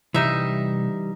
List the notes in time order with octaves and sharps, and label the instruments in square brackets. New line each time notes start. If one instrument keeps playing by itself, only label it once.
[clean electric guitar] C2 [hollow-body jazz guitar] E3 G3 [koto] D#4 E5